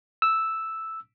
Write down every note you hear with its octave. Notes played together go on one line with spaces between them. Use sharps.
E6